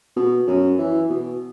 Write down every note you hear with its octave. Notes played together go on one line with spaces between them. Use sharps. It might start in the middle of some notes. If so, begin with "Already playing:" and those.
B2
F#2
E3
B2